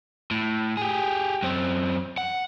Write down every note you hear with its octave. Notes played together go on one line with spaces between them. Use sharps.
A2
G4 G#4
F#2 C4
F#5